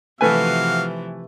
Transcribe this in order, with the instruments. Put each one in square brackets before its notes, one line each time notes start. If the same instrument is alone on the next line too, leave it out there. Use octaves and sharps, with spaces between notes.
[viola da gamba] C3 E3 F3 [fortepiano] A3 B4 G#5 [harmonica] F#4 F5